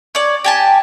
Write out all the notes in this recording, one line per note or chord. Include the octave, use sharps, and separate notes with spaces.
C#5 D5
G4 G#5 A5